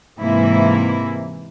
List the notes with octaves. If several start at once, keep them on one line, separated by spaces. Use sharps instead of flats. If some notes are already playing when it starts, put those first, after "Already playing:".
G#2 C3 E3 A#3 E4